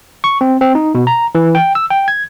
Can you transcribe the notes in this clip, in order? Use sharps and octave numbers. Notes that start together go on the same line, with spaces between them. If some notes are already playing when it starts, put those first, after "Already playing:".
C#6
C4
C4
D#4
B2
A#5
E3
G5
E6
G5
G#6